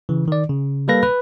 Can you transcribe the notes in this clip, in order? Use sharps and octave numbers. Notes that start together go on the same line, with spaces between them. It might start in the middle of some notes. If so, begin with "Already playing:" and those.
C#3 E3
D#3 D5
C#3
G3 A#3 A4 B4 F5 A#6
B4